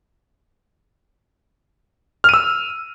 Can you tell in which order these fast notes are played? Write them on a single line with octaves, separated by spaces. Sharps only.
F6 D#7 E6